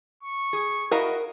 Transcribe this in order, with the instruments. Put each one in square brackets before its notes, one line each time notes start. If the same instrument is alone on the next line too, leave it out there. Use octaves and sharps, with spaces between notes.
[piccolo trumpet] C#6
[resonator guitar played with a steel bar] G#4
[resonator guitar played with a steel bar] E4 F#4 D#5 [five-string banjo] A#4 F5 A#5